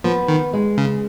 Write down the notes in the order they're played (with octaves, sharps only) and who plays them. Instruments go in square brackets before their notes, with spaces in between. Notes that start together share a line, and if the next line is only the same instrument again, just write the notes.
[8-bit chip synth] F3 [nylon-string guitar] B3
[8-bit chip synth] D#3
[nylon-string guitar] G#3
[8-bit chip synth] C#3